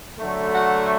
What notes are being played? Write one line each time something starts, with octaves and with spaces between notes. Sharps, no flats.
D3 F#3 A3
F#5